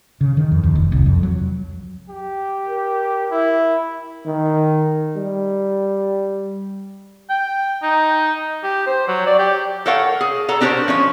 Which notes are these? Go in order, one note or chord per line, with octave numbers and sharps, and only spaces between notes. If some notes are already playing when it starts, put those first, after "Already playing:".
C#3
D#3
F2
D#2
F1
C2
F2
F#3
G4
A#4
E4
D#3
G3
G5
D#4
G4
C5
F#3
D5
G4
A4 A#4 C#5 F5 F#5
G#4
A4 C#5 F#5 A#5
C4 D4 G4 A#4 C5 C#5
F3 C#4 C#5